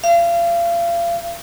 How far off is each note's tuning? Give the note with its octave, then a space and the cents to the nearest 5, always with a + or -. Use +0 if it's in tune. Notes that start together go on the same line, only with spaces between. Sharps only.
F5 -35